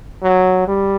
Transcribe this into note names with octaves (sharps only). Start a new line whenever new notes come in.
F#3
G3